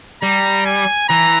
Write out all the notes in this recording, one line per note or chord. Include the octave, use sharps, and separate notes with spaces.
G3 A#5
G#5
E3 A#5